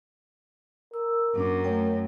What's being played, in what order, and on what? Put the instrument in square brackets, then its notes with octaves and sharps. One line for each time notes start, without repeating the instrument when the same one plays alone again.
[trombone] A#4 [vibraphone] E6
[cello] F#2 [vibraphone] A#3 C#4 D4
[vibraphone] A3 C#5 G5